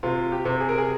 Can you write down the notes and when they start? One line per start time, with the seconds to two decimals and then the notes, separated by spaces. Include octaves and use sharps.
0.03 C3 F4
0.32 G4
0.45 C3
0.60 G#4
0.69 A#4
0.78 G#4